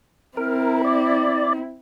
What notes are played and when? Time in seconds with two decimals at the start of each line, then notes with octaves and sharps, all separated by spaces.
0.37 C4 E4 A#4
0.85 D5